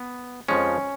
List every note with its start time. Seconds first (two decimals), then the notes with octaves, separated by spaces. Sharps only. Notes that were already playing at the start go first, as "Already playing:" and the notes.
Already playing: B3
0.49 F2 F3 G#3 C#4